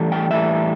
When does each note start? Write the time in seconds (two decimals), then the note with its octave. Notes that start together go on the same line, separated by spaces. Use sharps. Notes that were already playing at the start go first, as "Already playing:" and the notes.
Already playing: A2 E3 G3
0.12 G5
0.31 A2 E3 G3 E5